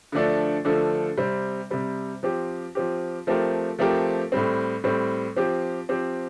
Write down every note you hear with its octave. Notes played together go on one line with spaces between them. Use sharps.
D3 F3 A3 D4 A4
D3 F3 A3 D4 A4
C3 G3 C4
C3 G3 C4
F3 C4 G4
F3 C4 G4
F3 A3 C4 G4 A#4
F3 A3 C4 G4 A#4
A2 G3 C4
A2 G3 C4
F3 C4 G4
F3 C4 G4